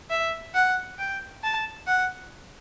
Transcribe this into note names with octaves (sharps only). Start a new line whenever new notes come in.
E5
F#5
G5
A5
F#5